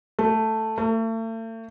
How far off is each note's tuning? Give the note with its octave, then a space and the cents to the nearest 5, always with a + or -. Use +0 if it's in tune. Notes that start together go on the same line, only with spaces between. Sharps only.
A3 +5
A3 +40